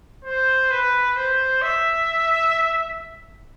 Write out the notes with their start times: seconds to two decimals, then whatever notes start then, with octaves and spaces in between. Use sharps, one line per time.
0.25 C5
0.71 B4
1.16 C5
1.62 E5